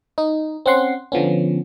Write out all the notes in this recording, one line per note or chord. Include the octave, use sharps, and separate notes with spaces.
D#4
C4 C#4 F#5 C6
D3 F3 B3 C#4